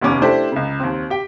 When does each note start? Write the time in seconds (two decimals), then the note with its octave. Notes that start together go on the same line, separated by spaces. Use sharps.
0.01 F1 D#2 B3 C#4 D6
0.21 A3 D4 E4 G4 C5
0.52 C#2 C#3
0.80 D#2 C4
1.10 G4 G5